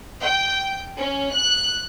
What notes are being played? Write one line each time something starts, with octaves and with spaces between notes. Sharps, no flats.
G5
C#4
F#6